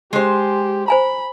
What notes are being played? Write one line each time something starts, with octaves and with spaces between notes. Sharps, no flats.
G#3 G4 C5
C5 G#5 A#5 B5